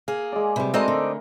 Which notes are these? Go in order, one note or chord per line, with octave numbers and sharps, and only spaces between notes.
A#3 G#4
G#3 D5
C3 G3 B4
G#3 A3 C4 D#4 F#4 A#4 D5 D#5
D3